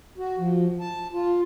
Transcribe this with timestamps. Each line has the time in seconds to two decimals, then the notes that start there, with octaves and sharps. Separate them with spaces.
0.18 F#4
0.38 F3
0.80 A5
1.13 F4